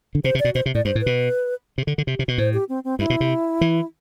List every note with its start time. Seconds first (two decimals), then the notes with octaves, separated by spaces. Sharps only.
0.15 D3
0.24 C3 C5
0.35 C3
0.39 D5
0.45 B2
0.55 B2 C5
0.66 C3
0.75 A2 D5
0.85 G2 C5
0.95 A2
1.01 B4
1.06 B2
1.78 C3
1.87 D3
1.98 D3
2.07 C3
2.19 C3
2.28 B2
2.38 A2 C5
2.53 G4
2.69 C4
2.84 C4
2.99 G2 E4
3.10 B2
3.20 C3
3.61 E3